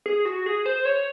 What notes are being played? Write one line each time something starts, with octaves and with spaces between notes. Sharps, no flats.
G#4
F#4
G#4
C5
C#5